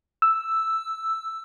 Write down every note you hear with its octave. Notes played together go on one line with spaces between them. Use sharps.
E6